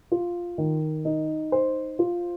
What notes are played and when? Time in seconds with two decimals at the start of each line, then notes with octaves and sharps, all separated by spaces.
0.12 F4
0.58 D#3
1.05 D#4
1.52 C5
1.99 F4